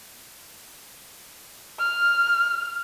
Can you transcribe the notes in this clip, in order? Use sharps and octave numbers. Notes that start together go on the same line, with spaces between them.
F6